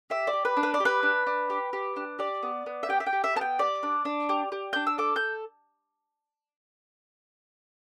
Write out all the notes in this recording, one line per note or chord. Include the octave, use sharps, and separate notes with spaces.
G4 E5
D5
G4
B4
D4
B4
D5
G4
B4
D4
D4
G4
G4
D4
G4 D5
B3
B3
E5
G4 G5
E5
G5
G4
E5
B3 A5
G5
G4 D5
D4
D4
G4
G4
D4 G6
E6
A4 D6
G6